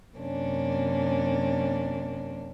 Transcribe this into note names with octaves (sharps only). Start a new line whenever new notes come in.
F#2 C3 A#3 C#4 D4